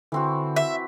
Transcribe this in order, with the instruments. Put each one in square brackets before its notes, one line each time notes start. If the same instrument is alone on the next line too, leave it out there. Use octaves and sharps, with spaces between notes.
[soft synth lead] D3 [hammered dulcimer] E3 C4 F#4
[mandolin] E5